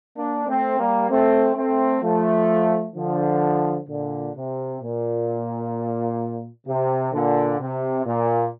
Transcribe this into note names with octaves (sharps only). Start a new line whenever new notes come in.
A#3 D4
A3 C4
G3 A#3
A3 C4
A3 C4
F3 A3
D3 F3
A#2 D3
C3
A#2
C3
A#2 D3
C3
A#2